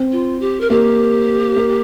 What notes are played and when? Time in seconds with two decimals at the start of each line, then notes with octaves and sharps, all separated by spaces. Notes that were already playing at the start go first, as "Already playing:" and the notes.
Already playing: C4
0.12 F4
0.41 G4
0.61 A#4
0.70 A#3 G4
1.56 A#3